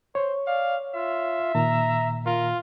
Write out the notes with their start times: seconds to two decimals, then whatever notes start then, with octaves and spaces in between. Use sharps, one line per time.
0.15 C5 C#5
0.47 D5 F5
0.95 F4 E5
1.55 A#2 D#3 A#5
2.26 F4 A#4